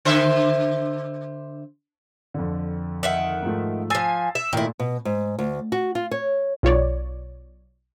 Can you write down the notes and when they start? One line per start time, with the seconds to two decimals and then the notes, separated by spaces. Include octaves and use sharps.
0.05 D3 C5 E5
2.34 F2 D3
3.03 D#3 E5 F#5
3.43 G#2 F3 A3
3.90 F3 G#5 E6 A6 C7
4.35 E5
4.53 A#2 D#3 A3 E4
4.79 B2
5.05 G#2
5.39 D2
5.72 F#4
5.95 F4
6.11 C#5
6.63 B1 F4 C#5 D5